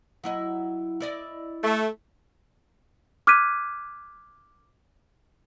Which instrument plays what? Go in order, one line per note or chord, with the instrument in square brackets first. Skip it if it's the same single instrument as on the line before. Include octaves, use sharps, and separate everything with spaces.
[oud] F#3 E4 D#5
E4 D5 D#5
[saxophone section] A3
[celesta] D6 F6 F#6 G#6 B6 D#7